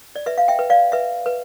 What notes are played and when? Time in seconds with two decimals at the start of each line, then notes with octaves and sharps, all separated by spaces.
0.16 D5
0.26 B4 E5
0.38 F5
0.48 E5 G5
0.59 B4
0.70 D5 F5
0.92 B4 E5
1.26 B4